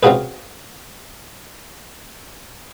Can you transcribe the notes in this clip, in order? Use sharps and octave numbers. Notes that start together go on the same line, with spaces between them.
C4 C#4 F4 F#4 G#4 B4